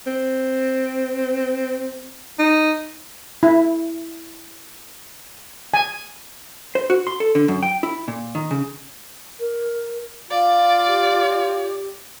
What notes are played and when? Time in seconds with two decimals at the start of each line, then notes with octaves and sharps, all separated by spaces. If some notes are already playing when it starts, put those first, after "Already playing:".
0.07 C4
2.39 D#4
3.43 E4
5.74 G#5
6.75 C5
6.90 F#4
7.07 C6
7.20 A4
7.35 D3
7.48 F#2
7.63 G5
7.83 E4
8.08 A#2
8.35 D#3
8.51 C#3
9.39 A#4
10.30 F4 D5 F5
10.87 G4